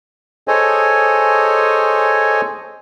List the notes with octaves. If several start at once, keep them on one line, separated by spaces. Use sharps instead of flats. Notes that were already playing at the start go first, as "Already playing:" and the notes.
G#4 A4 C5 C#5 D#5 G#5